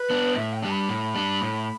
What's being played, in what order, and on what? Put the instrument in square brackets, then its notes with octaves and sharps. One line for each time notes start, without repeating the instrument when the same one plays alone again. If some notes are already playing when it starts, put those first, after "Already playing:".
Already playing: [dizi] B4
[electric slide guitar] B3 D4
[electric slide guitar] A2 [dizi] E5
[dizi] G5
[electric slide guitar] G3 D4
[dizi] B5
[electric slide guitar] A2
G3 D4
A2